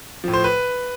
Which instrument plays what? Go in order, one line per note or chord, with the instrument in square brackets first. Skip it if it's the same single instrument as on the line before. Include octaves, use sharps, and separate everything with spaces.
[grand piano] A2 F3
C5
B4